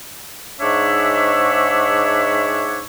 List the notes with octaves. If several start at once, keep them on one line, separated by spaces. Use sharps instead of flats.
G#2 D4 C#5 E5